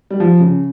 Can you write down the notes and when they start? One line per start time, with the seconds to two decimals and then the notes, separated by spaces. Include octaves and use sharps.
0.11 G3
0.20 F3
0.40 C#3